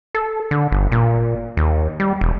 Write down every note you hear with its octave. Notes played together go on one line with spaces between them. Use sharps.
A4
D3
G1
A#2
D#2
G3
E1